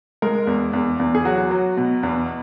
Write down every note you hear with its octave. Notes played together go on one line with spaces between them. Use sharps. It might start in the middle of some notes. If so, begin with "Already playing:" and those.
G#3 A#4
E2
E2
E2
G#4
F#3 F#4
F#3
B2
E2